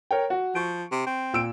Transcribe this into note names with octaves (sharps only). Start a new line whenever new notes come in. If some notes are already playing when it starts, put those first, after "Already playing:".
A#4 C#5 G5
F#4
F3 C#6 D7
C3
C4
A#2 E6 D7